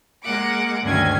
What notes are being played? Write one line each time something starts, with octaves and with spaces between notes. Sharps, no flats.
G#3 A#3 F#5 D6
D2 G2 D#3 C#4 G#5 G#6